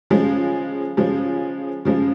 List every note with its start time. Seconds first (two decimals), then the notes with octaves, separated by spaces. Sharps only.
0.10 C#3 F3 G#3
0.97 C#3 F3 G#3
1.85 C#3 F3 G#3